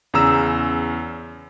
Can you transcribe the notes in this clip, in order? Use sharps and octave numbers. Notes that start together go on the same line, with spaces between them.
E2 C#3 A#5 E6 E7